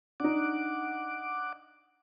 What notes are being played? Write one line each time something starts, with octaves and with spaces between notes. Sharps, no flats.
D4 D#4 F#5 D6